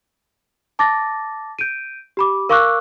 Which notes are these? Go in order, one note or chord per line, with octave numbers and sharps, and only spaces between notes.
A5 D6 A6 A#6
G6 D7 D#7
G4 B5 D6
A#4 F5 C#6 D6 E6 F#6